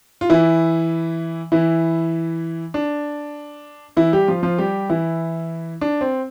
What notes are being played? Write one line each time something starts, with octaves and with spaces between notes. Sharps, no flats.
F4
E3 E4
E3 E4
D4
E3 E4
G3 G4
F3 F4
F3 F4
G3 G4
E3 E4
D4
C4